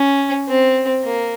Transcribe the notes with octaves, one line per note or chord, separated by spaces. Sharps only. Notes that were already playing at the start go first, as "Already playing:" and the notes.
Already playing: C#4
C4
A#3